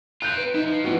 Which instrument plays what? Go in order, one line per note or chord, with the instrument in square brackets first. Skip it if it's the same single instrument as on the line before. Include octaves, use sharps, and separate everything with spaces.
[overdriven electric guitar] C4 F4 [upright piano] F#6 G6 F7
[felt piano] B4
[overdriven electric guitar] F2 E5 [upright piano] D#4
[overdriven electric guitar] F3
[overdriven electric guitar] G2 F3 [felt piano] E3 B3 F#4